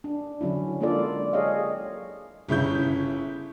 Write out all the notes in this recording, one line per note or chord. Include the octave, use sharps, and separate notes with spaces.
D4
D3 F#3 C#4 E4
G#3 A#3 D4 F4 A4 D5
G4 G#4 C#5 D#5 F5
G1 C#3 E4 G6